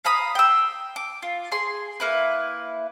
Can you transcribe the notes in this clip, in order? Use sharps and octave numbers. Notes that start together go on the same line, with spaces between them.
F5 A#5 B5 D#6
G5 E6
D6
F4
G#4 C6
A#3 E4 B4